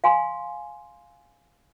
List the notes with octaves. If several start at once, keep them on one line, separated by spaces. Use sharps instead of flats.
F5 G#5 C6